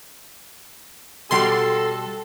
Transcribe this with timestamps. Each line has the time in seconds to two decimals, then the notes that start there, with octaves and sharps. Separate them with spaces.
1.31 B2 G3 F#4 A4 C6